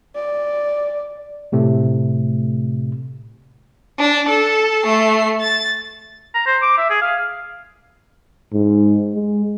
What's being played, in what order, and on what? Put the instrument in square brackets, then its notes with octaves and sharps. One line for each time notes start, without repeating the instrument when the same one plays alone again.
[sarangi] D5
[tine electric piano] A2 C3 A3
[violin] D4
A4
A3 C7
A6
[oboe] A#5
C5
D6
E5
G#4
F5
[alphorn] G#2
G#3